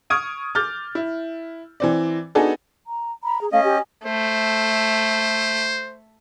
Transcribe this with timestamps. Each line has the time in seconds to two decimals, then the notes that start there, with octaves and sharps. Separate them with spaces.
0.10 C#6 D#6 F6 G#6 D7 D#7
0.55 D6 F6 G6 A6
0.95 E4
1.80 E3 C4 D5
2.35 B3 D4 D#4 F#4 G#4 A4
2.87 A#5
3.23 A#5 B5
3.41 G#4
3.52 A3 C#4 D#5 F5
3.64 G4 G#5
4.06 A3 C5